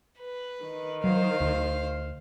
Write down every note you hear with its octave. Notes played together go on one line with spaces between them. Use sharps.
B4
D#3
F#3 C5 F5
D2